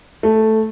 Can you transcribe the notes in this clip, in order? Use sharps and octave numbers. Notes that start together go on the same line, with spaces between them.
A3